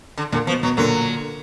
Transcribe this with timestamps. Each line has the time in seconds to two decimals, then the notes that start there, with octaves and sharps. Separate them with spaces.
0.18 D3
0.32 A#2 D3
0.47 B2 F3
0.63 B2 F#3
0.77 A#2 D3 F#3